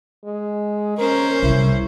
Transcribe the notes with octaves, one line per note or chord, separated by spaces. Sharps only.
G#3
C#4 A#4 C5
C2 E4